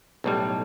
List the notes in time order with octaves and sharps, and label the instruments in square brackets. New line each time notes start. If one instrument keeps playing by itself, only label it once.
[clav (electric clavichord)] B1 A2 G3